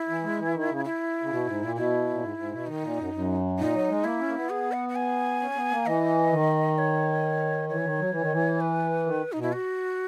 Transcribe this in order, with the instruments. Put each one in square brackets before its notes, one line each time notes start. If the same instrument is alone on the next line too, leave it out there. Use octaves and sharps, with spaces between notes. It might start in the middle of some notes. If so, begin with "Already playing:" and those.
Already playing: [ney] E4
[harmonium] E3
G#3
E3
D#3
C#3
[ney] E4
[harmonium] C#3
B2
G#2
A#2
[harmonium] B2 [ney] E4
[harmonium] A#2
G#2
G#2
B2
[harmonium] D#3 [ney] D#4
[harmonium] A#2
F#2
F#2
[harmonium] A#2 [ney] D#4
[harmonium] F#3
G#3
[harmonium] A#3 [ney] E4
[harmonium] C#4
A#3
B3
[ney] G#4
F#5
F#5
G#5
[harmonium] C#4
B3
A#3
[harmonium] E3 [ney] D#5
[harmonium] D#3
[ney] C#5
[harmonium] E3 [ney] C#5
[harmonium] D#3
F#3
E3
D#3
E3
[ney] B4
[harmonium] D#3
[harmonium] B2 [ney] D#4
[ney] E4
F#4